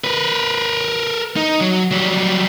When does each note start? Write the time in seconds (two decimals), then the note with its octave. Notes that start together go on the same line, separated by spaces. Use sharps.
0.04 A#4 B4
1.36 D#4
1.60 F#3
1.91 F#3 G3